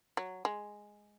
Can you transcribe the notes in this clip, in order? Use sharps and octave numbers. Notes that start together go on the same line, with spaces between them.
F#3
G#3